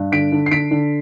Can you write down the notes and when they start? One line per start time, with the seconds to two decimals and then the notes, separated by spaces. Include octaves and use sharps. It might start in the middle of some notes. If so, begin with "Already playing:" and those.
Already playing: G2
0.12 D3 B6 D7
0.32 D3
0.46 C7
0.51 D3 B6 D7
0.71 D3